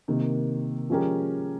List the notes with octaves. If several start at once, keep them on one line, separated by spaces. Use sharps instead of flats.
C3 D#3 A#3
F3 G#3 C#4 G4 A#4